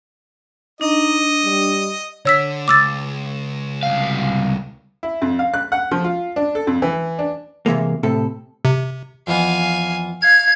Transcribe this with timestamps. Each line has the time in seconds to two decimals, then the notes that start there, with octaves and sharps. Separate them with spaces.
0.81 D4 D#4 D#5
1.45 G3
2.25 D3 C#5 E6 B6
2.68 C#2 D6 E6 A6
3.83 C2 F5
5.03 E4
5.22 F2
5.39 F5
5.54 F#6
5.72 F#5
5.91 F3
6.04 F4
6.36 D4
6.55 A4
6.67 F2
6.82 E3
7.19 D4
7.66 C3 E3 G#3 A#3
8.03 A2 C3 A4
8.65 C3
9.27 F2 E3 B3 F5 G#5
10.22 F5 G#6